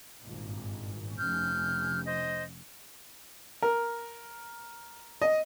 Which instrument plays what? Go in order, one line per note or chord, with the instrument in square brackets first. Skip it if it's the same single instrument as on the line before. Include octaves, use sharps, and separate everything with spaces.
[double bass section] G#1 G2 A#2
[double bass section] F1 C#4 [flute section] F6 G6
[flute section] C5 D#5
[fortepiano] A#4
D#5